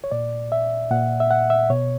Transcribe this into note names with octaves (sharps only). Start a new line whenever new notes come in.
C#5
A#2 D5
E5
A#2 F#5
E5
F#5
E5
B2 C#5